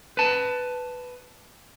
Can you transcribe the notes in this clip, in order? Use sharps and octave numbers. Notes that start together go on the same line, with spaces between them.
B4 A5